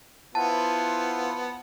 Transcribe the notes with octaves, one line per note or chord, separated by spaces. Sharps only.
B3 E4 F4 C5 F#5 A5